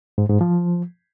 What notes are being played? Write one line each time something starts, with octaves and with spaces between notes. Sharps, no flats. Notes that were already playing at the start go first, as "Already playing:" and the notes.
G#2
G#2
F3